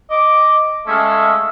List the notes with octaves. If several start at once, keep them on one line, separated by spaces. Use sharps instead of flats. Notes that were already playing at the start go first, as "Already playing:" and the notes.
D#5 D6
G#3 A3 C#4 E5 F5